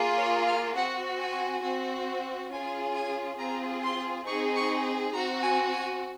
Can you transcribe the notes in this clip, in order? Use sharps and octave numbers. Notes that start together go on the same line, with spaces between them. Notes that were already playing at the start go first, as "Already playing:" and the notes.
Already playing: A#3 F4 G#4
C#5
F5
C4 F#4 F#5
G#5
C4 F#4
C#4 F4 G#4 G#5
G#5
C4 F4 G#4 A#5
C6
C4 D#4 G#4 C#6
C#6
C4 F#4 A#5
G#5
G#5